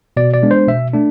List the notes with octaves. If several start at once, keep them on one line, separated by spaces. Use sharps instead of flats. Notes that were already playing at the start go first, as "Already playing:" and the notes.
B2 D5
D5
G#3 B3 D4
C5
B2 E5
A3 D4